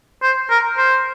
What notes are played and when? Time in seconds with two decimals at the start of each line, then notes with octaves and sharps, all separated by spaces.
0.22 C5
0.50 A#4
0.78 C5